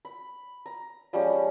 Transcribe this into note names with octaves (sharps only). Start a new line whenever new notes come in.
B5
A#5
F3 G3 G#3 C#4